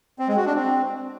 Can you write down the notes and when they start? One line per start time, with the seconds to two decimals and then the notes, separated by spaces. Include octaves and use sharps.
0.19 C4
0.28 G#3
0.37 F#4
0.46 D4
0.55 C4